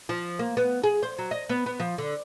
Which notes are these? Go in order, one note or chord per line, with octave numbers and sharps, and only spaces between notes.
F3
A#3
B3
G#4
C5
F#3
D#5
B3
B3
F3
D3